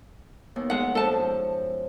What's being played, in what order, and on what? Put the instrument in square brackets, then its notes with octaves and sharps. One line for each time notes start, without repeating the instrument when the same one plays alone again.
[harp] D#2 B3
[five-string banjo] G#3 F#5
[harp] F#2 F3 G#3 [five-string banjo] A4 A5